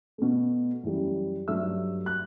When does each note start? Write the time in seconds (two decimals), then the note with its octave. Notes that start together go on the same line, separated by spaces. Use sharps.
0.18 B2 A3
0.83 F#2 E3 G3
1.48 G2 F#3 A3 E5 E6
2.06 F#6